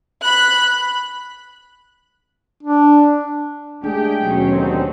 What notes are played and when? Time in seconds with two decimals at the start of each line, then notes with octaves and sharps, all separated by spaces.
0.22 B5 F#6
2.63 D4
3.84 G#3 A3 D4 G4 G#4 G5
4.21 D#2 B2 F#3 C#4
4.52 D3 C4 D#4